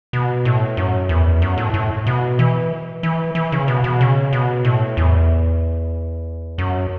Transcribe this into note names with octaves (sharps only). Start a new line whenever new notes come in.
B2
A2
F#2
E2
F#2
A2
A2
B2
E3
E3
E3
C#3
B2
B2
C#3
B2
A2
E2
F#2